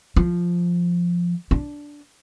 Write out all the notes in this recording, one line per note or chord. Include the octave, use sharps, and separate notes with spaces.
F3
D4